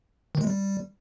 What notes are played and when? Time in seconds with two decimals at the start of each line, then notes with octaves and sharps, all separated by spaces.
0.35 D#3
0.41 G#3
0.47 G3